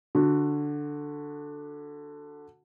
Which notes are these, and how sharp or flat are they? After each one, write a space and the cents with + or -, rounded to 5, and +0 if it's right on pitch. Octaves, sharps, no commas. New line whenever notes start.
D3 +0 F#4 -10